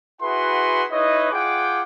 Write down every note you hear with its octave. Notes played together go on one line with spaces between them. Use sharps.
E4 F#4 G#4 B4 F#5 C6
D#4 E4 B4 C#5 D#5
F4 G#4 F#5 G5 D6